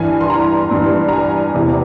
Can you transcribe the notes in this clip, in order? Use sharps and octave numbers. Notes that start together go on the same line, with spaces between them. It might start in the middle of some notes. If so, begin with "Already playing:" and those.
Already playing: G2 E3 G#5
C6
A#5
G2 E3
A#5
G#5
E2 C3 E3